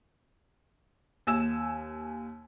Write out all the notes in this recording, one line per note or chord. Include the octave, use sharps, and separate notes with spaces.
D#2 G#5 E6 E7